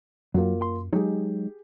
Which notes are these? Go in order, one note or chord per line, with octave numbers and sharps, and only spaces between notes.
F#2 F#3 A#3 F4 F#4
C6
F#3 G#3 D#4 G4 G#4